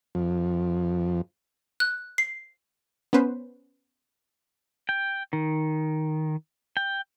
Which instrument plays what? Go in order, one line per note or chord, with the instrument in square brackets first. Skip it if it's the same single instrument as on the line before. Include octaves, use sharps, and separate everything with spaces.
[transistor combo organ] F2
[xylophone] F#6
C7
[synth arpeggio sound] B3 C#4 B4 C5
[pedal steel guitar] G5
D#3
G5